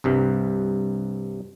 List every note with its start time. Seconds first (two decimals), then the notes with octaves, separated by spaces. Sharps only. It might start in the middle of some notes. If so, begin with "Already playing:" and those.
0.04 C2 G2 C3